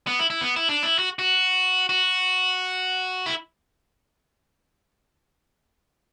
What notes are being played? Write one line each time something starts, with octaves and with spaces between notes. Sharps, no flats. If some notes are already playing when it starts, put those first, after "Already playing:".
B3
E4
E4
B3
E4
D4
E4
F#4
F#4
F#4
E4